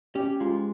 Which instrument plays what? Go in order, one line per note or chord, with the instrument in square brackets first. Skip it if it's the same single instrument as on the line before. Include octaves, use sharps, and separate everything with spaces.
[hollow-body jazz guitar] C#4 [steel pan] G4
[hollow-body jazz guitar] G#3 [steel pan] F4